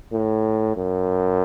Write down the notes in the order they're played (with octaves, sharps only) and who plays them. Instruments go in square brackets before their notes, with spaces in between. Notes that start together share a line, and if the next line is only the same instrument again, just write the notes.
[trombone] A2
F#2